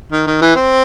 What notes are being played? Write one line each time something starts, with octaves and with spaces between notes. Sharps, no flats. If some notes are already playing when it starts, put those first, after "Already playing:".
D#3
D#3
E3
C4